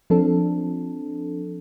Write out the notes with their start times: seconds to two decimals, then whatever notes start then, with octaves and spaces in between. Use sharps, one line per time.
0.10 F3 C4 D4 A4